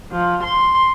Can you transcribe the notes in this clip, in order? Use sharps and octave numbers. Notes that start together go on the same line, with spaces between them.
F3
C6